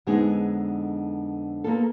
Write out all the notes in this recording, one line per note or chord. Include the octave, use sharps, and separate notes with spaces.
F2 D3 G#3 B3 D#4 G#4
A#3 B3 F4 A4